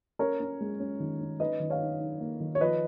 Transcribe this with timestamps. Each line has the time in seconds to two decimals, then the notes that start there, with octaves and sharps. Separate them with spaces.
0.19 C#4 A#4 C#5
0.40 C#4
0.61 G#3
0.80 C#4
1.00 D#3
1.20 C#4
1.40 D#4 B4 D#5
1.60 D#3
1.70 C#5 F5
1.80 D#4
2.00 D#4
2.20 A#3
2.40 D#3
2.55 C#5
2.61 F3 B4 D#5